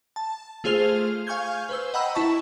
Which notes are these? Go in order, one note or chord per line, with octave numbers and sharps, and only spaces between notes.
A5
A3 F4 G#4 C5 F6 F7
F5 G#5 C#6 F6 G6 G#6
B4 C5 E6
D#5 F#5 G5 A#5 B5 E6
E4 E5 A5 C#6